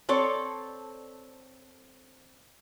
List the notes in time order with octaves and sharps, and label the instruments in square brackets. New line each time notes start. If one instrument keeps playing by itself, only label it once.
[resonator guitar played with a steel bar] C4 A4 C#5 D5